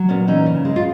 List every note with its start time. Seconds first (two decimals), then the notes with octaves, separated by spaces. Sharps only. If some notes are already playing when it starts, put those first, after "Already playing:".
Already playing: F#3
0.09 A#2 B3 C#4
0.27 E3 C#4 D#4
0.46 C#3
0.65 G#3
0.76 F4